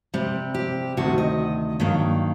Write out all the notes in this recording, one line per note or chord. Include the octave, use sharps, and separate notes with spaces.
C3 G3 C4
G4
D2 C3 D#3 F#4
D#5
G2 D#3 F#3 A#3